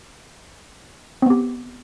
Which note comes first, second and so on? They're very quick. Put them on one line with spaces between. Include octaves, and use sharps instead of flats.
C4 B3 G4